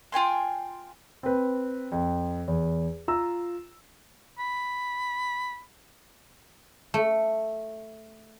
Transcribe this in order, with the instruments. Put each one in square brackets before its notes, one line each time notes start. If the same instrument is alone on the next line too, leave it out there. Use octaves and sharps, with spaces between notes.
[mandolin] F4 G5 G#5 C6
[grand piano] C4 B4
F2
E2
F4 A#5 E6
[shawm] B5
[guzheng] A3